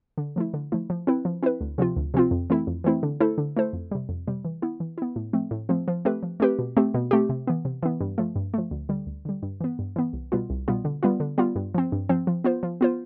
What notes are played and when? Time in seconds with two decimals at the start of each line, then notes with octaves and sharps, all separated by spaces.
0.18 D3
0.36 F3 A3 E4
0.54 D3
0.72 F3 A3 E4
0.90 F3
1.07 C4 E4 B4
1.25 F3
1.43 C4 E4 B4
1.61 D2
1.78 C3 F3 C4 F4
1.96 D2
2.14 C3 F3 C4 F4
2.31 F2
2.50 E3 A3 C4 E4
2.67 F2
2.84 E3 A3 C4 E4
3.03 D3
3.20 A3 E4 A4 C5
3.38 D3
3.57 A3 E4 A4 C5
3.73 F2
3.91 C3 G3
4.09 F2
4.27 C3 G3
4.45 E3
4.62 B3 E4
4.80 E3
4.98 B3 E4
5.16 A2
5.33 F3 A3 C4
5.51 A2
5.69 F3 A3 C4
5.88 F3
6.05 A3 C4 G4 B4
6.23 F3
6.40 A3 C4 G4 B4
6.59 B2
6.77 A3 C4 G4
6.94 B2
7.11 A3 C4 G4
7.29 C3
7.47 E3 B3
7.65 C3
7.83 E3 B3
8.01 G2
8.18 F3 A3
8.36 G2
8.54 F3 A3
8.71 D2
8.89 D3 G3
9.07 D2
9.25 D3 G3
9.43 G2
9.61 E3 B3
9.79 G2
9.96 E3 B3
10.13 C2
10.32 B2 G3 B3 F4
10.50 C2
10.68 B2 G3 B3 F4
10.85 D3
11.03 G3 B3 F4
11.20 D3
11.38 G3 B3 F4
11.56 G2
11.74 F3 C4
11.92 G2
12.09 F3 C4
12.27 F3
12.44 B3 F4 C5
12.63 F3
12.81 B3 F4 C5